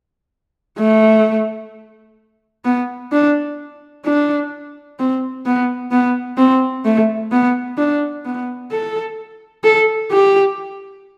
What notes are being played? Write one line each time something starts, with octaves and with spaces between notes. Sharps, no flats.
A3
B3
D4
D4
C4
B3
B3
C4
A3
B3
D4
B3
A4
A4
G4